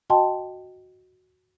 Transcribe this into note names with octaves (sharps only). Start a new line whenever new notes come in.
F#4 D#5 G5 A5 C6